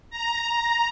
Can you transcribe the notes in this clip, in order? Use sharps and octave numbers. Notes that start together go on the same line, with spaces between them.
A#5